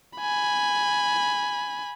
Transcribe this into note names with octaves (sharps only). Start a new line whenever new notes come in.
G#5 B5